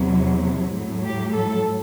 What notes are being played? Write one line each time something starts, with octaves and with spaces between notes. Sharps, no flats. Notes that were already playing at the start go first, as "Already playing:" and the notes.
Already playing: E2 C3 F#3
A2 F#3
G4
A4